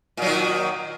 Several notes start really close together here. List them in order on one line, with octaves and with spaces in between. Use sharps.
A#2 F#3 D#3